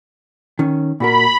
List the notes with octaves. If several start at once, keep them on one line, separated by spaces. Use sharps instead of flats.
D#3 C#4
A#2 F#4 A#4 B5